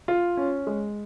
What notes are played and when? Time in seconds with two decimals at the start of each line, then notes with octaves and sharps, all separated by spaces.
0.08 F4
0.37 C#4
0.67 G#3